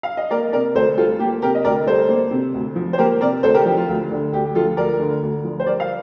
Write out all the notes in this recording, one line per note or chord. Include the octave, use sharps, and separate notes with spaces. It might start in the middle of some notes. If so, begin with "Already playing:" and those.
F5
D#5
A#3 A#4 D5
C3 A#4 D5
D2 A4 C5
G3 F4 A4
A#3 G4
C3 G4 A#4
D#5
D2 A#4 D5
G3 A4 C5
A#3
C3
D2
F3
C5
A#3 G4 A#4
C3 A#4 D5
D2 A4 C5
G4 A#4
F3 G4
F4
D2
D3
D2 G4
G4
F3 F4 A4
D2 A#4 D5
D3
D2
F3
C5
G3 A#4 D5
F5